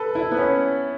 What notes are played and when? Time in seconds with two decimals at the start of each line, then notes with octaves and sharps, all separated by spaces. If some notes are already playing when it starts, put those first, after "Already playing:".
Already playing: A4 B4
0.15 E4
0.31 B3
0.38 C#4